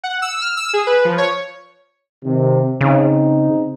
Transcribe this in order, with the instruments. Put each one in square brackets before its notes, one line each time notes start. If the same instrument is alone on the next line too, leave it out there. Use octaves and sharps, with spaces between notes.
[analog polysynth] F#5
E6
F6
E6
G#4
B4
F3
C#5
[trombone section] C3 D#3
[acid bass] C#3 [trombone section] C4 D#4